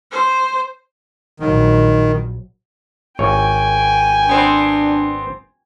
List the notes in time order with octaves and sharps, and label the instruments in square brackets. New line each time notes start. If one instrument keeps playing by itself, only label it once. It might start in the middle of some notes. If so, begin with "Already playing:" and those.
[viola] C5
[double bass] A#1 F#3 [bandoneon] D#3
[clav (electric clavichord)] G#1 C#5 [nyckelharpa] G5 G#5
[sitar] B3 C4 [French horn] D4